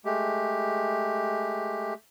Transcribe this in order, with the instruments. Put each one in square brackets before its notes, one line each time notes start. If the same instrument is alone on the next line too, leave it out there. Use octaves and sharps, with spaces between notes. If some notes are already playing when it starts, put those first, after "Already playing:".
[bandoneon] G#3 A3 G4